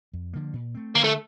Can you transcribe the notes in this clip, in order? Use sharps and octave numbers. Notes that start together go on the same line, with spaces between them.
F2
D3 F3 A#3
A#2
A3 C4
D3 A#3
A3